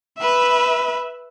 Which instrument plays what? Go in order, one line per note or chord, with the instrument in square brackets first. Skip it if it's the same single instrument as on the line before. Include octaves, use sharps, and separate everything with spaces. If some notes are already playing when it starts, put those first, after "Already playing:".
[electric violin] B4 E5